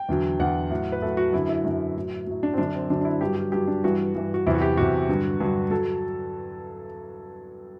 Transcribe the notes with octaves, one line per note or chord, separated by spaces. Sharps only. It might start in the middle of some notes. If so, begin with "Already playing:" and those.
Already playing: G5
E2 D3 F#3
E2 D3 F#3 F#5
A2 F#3
B4
A2 F#3 A4
F#4
F#2 D3 F#3 E4
E4
F#2 D3 F#3
A2 F#3
A2 F#3
D4
C4
F#2 D3 F#3 D4
C4
F#2 D3 F#3 D4
D4
E4
G2 F#3 G4
G4
G2 F#3 G4
D4
G2 E3 F#4
G2 E3
F#4
E2 C3 F#3 E4
F#4
G4
E2 C3 F#3 F#4
G2 D3 F#3
G2 D3 F#3
F#3 A4